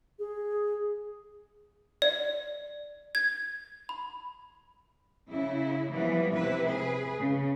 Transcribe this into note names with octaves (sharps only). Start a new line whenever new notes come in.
G#4
D5
G#6
B5
C#3 E4
E3 F3 G3 B3
C3 E4 B4
G#4 B4
C#3